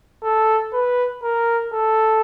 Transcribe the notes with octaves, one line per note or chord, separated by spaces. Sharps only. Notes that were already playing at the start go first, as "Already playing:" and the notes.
A4
B4
A#4
A4